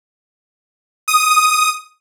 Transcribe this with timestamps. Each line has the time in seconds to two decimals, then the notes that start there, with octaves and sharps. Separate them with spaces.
1.08 D#6